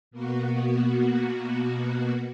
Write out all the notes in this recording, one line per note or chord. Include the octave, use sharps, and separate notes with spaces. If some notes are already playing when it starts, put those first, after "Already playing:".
B2 A#3 B3 F#4